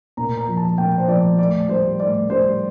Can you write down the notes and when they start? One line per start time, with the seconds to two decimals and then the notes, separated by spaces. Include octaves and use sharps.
0.17 A#2 A#5
0.37 A#5
0.48 F3
0.57 A5
0.78 A#2 G5
0.98 C5
1.08 F3 D5
1.39 A2 D5
1.69 G3 C5
2.00 A2 D5
2.30 G3 C5